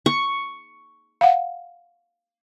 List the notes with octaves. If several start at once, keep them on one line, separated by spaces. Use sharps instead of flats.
C#6
F5 F#5